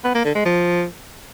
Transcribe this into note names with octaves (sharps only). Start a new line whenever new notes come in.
B3
A#3
D3
G#3
F3